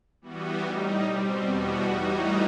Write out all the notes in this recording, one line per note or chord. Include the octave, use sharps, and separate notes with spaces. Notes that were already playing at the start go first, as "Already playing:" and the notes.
E3 G3 B3 F#4
A2 G3 D#4
B2 G3 C4
E2 B2 G3 B3 F#4
A2 E3 G3 D#4 F#4